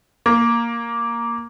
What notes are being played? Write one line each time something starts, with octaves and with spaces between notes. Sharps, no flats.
A#3